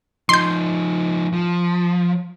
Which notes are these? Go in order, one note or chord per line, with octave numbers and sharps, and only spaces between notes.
F3 D#4 C6 G6
F3